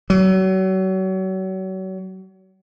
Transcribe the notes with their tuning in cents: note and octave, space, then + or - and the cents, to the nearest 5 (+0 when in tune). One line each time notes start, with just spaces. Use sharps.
F#3 +35